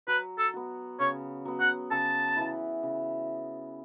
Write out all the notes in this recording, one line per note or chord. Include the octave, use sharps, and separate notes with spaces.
F#3 B4
A4
B3 F#4
C#3 C#5
F#3 B3
F#5
C#3 A5
E3 B3 E4
C#3